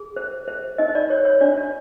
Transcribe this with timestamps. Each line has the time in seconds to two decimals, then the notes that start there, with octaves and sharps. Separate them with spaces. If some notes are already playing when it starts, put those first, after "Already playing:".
Already playing: G#4
0.16 C5
0.48 C5
0.78 D#4 D#5
0.95 D5
1.10 C5 C#5
1.25 C#5
1.41 D4 D5
1.58 D5